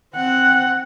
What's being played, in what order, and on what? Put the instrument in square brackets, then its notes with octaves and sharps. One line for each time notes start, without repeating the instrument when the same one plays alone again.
[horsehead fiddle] C4 F#5